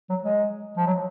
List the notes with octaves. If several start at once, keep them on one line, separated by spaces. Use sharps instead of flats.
F#3
G#3
F3
F#3